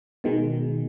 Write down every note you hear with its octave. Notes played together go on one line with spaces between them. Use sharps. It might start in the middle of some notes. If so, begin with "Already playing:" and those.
B2 D#3 G#3